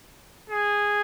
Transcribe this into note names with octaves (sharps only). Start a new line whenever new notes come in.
G#4